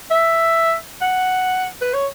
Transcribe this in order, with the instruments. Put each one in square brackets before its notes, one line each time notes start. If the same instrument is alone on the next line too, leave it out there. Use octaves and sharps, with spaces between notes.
[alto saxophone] E5
F#5
B4
C#5